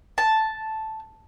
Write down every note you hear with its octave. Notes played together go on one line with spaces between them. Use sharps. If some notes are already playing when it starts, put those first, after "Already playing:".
A5